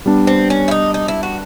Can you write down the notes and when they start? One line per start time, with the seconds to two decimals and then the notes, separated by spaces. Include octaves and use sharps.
0.06 G3 B3 D4
0.27 C4
0.50 C#4
0.68 E4
0.71 D#4
0.94 D#4
1.08 E4
1.23 F#4